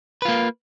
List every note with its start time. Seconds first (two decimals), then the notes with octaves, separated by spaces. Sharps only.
0.22 B4
0.25 F4
0.28 A#3